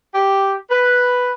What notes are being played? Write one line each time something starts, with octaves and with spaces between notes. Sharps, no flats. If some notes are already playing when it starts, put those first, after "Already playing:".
G4
B4